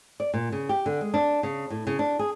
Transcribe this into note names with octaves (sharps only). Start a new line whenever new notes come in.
D5
A#2
C#3
G4
D3
G#3
D4
C#3
A2
C#3
D4
G#4